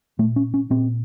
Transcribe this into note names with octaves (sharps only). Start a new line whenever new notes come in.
A#2 A3
C#4
C#4
A#2 C4